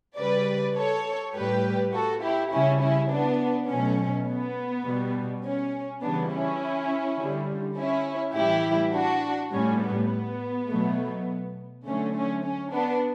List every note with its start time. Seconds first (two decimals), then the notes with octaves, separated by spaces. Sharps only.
0.17 C#3 G3 B4 D5
0.76 A4 C#5
1.34 A2 G3 G4 B4
1.93 F#4 A4
2.22 E4 G4
2.51 C#3 G3 C#4 E4
2.81 C#4 E4
3.10 B3 D4
3.68 B2 F#3 A3 C#4
4.27 B3
4.85 B2 G3
5.44 C#4
6.02 C#3 E3 G3 B3 D4
6.31 C#4 E4
7.18 D3 G3
7.77 C#4 E4
8.35 A2 E3 G3 E4 G4
8.94 D4 F#4
9.52 A2 G3 C#4
9.82 B3
10.11 B3
10.69 B2 F#3 A3
11.86 D3 F#3 A3 C#4
12.15 C#4
12.44 C#4
12.73 B3 D4